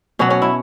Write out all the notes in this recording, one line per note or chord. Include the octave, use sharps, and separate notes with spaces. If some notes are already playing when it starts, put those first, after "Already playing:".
B2 F#3 C#4
C#4
E4